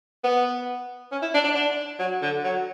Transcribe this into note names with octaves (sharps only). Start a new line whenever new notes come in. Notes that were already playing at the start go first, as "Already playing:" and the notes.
B3
C#4
E4
D4
D4
D4
F#3
D3
F#3